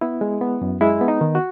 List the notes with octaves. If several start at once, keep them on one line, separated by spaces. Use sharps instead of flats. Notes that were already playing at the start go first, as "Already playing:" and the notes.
B3 E4
G#3
B3
F#2
G#3 E4
B3
D#4
D#3
F#4